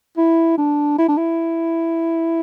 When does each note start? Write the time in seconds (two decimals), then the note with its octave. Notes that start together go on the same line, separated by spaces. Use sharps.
0.17 E4
0.57 D4
0.98 E4
1.08 D4
1.17 E4